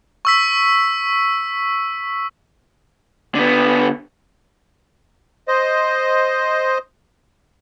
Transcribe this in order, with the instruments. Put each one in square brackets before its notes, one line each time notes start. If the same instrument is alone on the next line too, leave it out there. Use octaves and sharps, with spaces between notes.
[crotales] C#6 E6 B6
[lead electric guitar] D3 B3
[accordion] C5 D#5